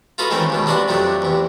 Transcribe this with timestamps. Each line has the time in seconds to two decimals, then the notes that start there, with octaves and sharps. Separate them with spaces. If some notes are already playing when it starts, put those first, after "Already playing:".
0.18 F4 F#4 A4 B4 D#5
0.30 D#3 E3 G#3 A3 C4 C#4
0.50 C#2 B2 D#3
0.66 C2 D4 F#4 B4 C6
0.88 F2 C3 F#3 A3 D4
1.22 E2 C3